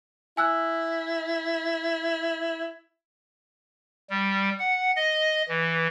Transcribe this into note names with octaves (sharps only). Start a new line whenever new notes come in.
E4 G#5 E6 F#6
G3
F#5
D#5
E3